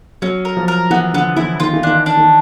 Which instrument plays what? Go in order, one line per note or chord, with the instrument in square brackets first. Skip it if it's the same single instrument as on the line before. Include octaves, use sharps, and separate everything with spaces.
[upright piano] F#3 [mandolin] C#4
[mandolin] A#4
[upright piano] F3
[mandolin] A#4
[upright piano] E3 [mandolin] B3
[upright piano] D3 [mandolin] B3
[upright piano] E3 [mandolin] E4
[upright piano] D#3 [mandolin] F4
[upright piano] E3
[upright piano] D#3 [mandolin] D4
[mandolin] D4
[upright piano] D#3